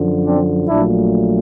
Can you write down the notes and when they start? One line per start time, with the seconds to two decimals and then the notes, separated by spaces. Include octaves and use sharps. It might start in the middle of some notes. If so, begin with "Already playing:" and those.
Already playing: F#2 D3 F3
0.25 C4 D4
0.69 A#1 A#2 F#3 A3 D4 E4